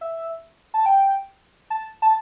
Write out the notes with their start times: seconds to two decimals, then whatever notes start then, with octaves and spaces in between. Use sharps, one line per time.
0.01 E5
0.74 A5
0.86 G5
1.70 A5
2.02 A5